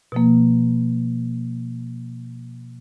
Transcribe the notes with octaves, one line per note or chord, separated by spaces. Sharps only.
B2 F3 A#3